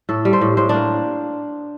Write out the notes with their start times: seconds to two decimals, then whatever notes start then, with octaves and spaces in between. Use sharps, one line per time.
0.09 A2 A4
0.25 G3
0.33 C5
0.41 A2
0.57 A2 C5
0.69 A#3 D4